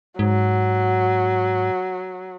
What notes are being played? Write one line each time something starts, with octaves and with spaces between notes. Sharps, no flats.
G#2 F#3